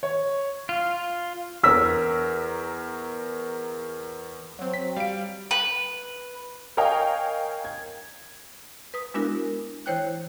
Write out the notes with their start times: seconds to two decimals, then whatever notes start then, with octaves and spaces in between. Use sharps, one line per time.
0.03 C#5
0.69 F4
1.63 E2 A#4 E6 B6
4.59 F#3 C4
4.74 B6
4.96 G3 F5 D7
5.51 B4
6.77 A#4 C#5 D#5 F5 G5 G#5
7.65 G#6
8.94 B4 D#6
9.14 G#3 B3 D4 E4 F#4 A#4
9.86 E3 E4 C5 C#5 G5 F#6